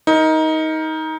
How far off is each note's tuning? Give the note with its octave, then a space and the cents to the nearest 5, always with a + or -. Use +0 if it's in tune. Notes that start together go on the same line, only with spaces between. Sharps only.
D#4 +20 A#4 +0